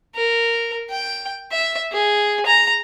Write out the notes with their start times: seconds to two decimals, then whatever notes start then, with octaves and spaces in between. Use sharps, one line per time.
0.15 A#4
0.90 G5
1.52 E5
1.92 G#4
2.46 A#5